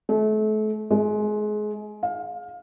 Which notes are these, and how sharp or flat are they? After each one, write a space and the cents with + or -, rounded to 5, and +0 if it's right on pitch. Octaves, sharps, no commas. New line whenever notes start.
A3 -35
G#3 +25
F5 +20